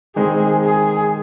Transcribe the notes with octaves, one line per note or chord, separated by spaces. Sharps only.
D#3 G#3 C4 D#4 G#4
G#4